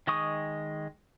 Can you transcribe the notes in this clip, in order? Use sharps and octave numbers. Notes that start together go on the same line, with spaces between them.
D#3 G#3 D#5 C#6 D#6